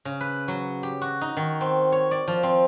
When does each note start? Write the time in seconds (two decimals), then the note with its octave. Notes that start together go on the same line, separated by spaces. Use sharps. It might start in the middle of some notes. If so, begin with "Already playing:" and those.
0.05 C#3
0.21 B4
0.48 F#3
0.83 G4
1.02 F#4
1.21 D#4
1.37 D#3
1.61 C4
1.92 C#5
2.11 D5
2.28 F3
2.43 C4